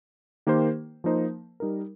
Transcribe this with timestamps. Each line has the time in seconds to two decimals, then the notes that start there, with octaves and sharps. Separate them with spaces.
0.47 D#3 A#3 G4 C5
1.04 F3 A#3 D#4 C5
1.60 G3 D#4 A#4